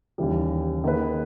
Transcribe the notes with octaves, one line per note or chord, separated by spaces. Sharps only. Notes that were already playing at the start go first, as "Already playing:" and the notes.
D#2 C#3 E3 G3
D#3 A#3 D#4 G#4 B4